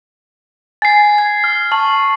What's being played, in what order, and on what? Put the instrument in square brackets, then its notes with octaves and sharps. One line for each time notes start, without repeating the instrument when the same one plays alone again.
[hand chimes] G#5 [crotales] A6 C7
[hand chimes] G#6
[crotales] F6
[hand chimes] A5 [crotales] C#6 F6 F#7